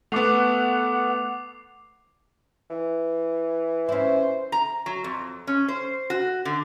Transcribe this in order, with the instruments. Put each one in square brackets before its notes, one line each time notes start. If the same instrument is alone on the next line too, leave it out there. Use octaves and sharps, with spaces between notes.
[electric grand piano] A3 B3 [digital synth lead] F#5 [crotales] D6 C7 F7
[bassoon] E3
[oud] C#4 E4 [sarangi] C5
[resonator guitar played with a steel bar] A#5
F#3
F2
C#4
C5
F#4
D3